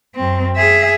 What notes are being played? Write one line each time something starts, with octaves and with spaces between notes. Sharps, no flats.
F#2 C4
G#4 E5